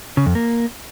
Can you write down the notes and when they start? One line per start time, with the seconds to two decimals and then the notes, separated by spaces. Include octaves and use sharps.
0.17 C#3
0.26 F2
0.35 A#3